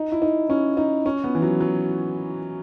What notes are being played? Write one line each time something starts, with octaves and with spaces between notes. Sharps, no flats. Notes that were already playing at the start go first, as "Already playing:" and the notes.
Already playing: D#4
E4
D#4
C#4
D#4
C#4
B3
E3
F#3
F#3